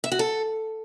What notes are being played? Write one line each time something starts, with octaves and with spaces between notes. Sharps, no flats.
E5
F#4
A4